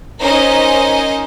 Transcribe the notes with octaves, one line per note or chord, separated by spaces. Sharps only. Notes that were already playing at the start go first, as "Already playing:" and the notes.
C#4 D#4 A#4 C5 D#5 G#5